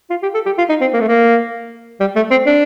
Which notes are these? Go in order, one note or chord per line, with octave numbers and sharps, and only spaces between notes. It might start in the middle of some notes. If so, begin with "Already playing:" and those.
F4
G4
A4
G4
F4
D#4
C4
A#3
A3
A#3
G3
A3
C4
D4